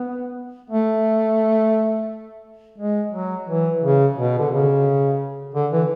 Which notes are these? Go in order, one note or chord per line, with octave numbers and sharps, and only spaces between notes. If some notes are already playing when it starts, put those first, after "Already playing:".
Already playing: B3
A3
G#3
F#3
E3
C#3
B2
D3
C#3
D3
E3